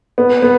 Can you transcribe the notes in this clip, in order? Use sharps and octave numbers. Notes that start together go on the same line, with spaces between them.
B3
B3